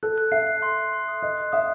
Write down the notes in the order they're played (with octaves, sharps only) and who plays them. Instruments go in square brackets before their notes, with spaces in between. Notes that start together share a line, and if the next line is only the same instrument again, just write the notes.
[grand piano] A4 [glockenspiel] F#6
[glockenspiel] F#6
[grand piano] E5 [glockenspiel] C7
[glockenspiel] C7
C6
C6
C6
D#6
[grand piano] D#5 [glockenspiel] F#6
[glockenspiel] F#6
[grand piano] E5 [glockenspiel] D#6